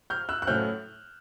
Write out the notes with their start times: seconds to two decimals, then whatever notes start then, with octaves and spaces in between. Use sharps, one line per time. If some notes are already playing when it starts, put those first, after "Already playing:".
0.10 F6 G6
0.29 E6 F#6
0.42 F#6
0.47 A2 F#3 A3 C#4 F6 G6